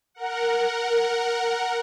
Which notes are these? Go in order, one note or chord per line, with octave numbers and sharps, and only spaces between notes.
A#4 F#5